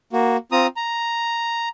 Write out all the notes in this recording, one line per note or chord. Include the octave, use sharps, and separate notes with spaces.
A#3 F#4
C4 F4 A#5 D#6
A#5